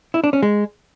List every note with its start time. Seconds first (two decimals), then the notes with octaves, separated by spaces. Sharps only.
0.14 E4
0.24 D4
0.33 C#4
0.43 G#3